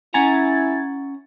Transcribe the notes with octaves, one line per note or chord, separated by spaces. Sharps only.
C#4 E4 F#5 G#5 A#5 G#6 A6